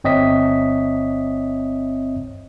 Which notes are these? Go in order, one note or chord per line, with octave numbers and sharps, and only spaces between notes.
G1 C4 C#5 D#5 E5 B6